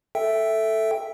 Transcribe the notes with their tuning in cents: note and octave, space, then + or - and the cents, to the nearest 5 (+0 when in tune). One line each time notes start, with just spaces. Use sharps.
A4 +0 E5 +0 G5 +0